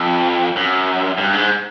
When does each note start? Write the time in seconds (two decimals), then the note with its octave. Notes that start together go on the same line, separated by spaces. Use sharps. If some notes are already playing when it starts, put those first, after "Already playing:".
Already playing: F2
0.56 F#2
1.18 G2
1.33 G#2